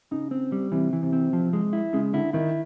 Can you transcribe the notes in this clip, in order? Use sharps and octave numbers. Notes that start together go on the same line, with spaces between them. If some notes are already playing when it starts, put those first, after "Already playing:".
C#3 D#4
C4
G3
C3 E3
E3
C3
C4
F3
G#3
E4
C#3 G#3
D3 E4
D#3 E4